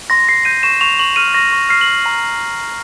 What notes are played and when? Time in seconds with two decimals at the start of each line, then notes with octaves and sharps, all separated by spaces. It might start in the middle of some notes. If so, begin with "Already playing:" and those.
0.10 C6 A#6
0.27 C6 C7
0.45 G6 D#7
0.63 C#6 E7
0.81 C#6 F7
0.99 C#6 F#7
1.16 F6 D#7
1.34 C#6 A#6
1.53 C#6
1.69 F6 C7
1.81 F#7
1.87 C#6
2.06 A#5